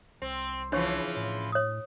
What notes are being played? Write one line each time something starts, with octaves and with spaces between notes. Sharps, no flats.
C2 C4
C#3 E3 F3 D4 C#5 C#6
A2
C#5 D#6